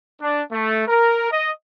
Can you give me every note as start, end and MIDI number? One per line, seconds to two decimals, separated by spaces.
0.21 0.41 62
0.52 0.83 57
0.88 1.28 70
1.31 1.50 75